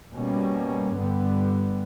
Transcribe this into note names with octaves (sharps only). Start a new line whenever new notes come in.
B2 G3 A#3 C#4
G2 D3 G3 B3